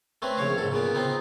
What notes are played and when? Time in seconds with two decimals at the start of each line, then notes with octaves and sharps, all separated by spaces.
0.22 A3 C4 C#4 B4
0.38 A#1 C#3 C#5 F5
0.58 G#2 A4
0.71 A#2 C#3 B3
0.95 B3 C4 D#4 F4